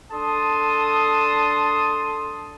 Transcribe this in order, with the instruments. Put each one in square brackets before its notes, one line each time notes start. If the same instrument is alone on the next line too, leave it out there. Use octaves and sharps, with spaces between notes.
[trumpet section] D4 A4 A5 C6 D#6